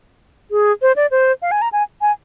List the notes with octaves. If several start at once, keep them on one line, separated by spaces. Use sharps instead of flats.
G#4
C5
D5
C5
F5
G#5
A#5
G#5
G#5